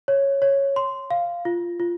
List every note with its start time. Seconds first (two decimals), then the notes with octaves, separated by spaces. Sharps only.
0.08 C#5
0.42 C#5
0.76 C6
1.11 F5
1.45 F4
1.80 F4